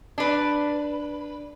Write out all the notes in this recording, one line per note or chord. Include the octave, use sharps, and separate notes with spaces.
D4 B4